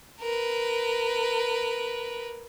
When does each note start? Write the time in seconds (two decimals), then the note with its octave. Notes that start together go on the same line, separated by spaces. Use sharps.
0.21 A#4 B4